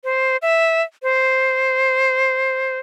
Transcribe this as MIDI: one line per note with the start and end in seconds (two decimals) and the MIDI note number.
0.04 0.37 72
0.42 0.82 76
1.03 2.79 72